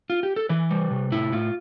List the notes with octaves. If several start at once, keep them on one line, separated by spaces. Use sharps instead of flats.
F4
G4
A4
E3 B4
G3
C3
A2 E4
A2 F4